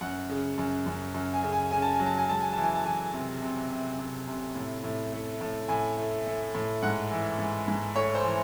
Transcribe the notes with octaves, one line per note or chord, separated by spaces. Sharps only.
F#2 F#5
C#3
F#2
F#2
F#2
G#5
C#3
G#5
C#3 G#5
A5
G#5
F#3
A5
G#5
G#3 A5
G#5
E3 A5
G#5
A5
E3 G#5
C3
C3
C3
C3
C3
A2
A2
A3
A2
A2 G#5
A3
A3
A2
G#2 F#5
E3
G#2
G#2
A3 C#5
C5
E3